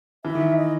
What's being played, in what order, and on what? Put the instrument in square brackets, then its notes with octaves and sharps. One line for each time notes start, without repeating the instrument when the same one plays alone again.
[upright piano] E3 [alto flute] E5
[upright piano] D#3
[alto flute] D#5